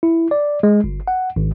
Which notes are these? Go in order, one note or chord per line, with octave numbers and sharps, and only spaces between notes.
E4
D5
G#3
G1
F#5
G#1